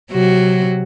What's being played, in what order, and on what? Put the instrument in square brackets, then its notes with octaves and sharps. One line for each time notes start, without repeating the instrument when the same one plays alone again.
[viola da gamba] C3 F#3 F#4